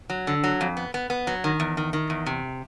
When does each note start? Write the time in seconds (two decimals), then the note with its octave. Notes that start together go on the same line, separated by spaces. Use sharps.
0.10 F#3
0.27 D3
0.44 F#3
0.61 F2
0.77 B3
0.94 B3
1.10 B3
1.27 F#3
1.44 D#3
1.60 E2
1.77 D#3
1.93 D#3
2.10 E2
2.26 C3